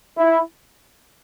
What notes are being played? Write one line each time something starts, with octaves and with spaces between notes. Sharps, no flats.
E4